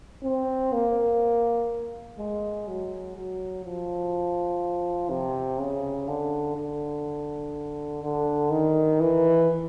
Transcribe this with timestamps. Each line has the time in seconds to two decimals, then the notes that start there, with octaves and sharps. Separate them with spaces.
0.23 C4
0.73 A#3
2.18 G#3
2.67 F#3
3.16 F#3
3.65 F3
5.10 C3
5.59 C#3
6.08 D3
6.56 D3
8.03 D3
8.50 D#3
9.00 E3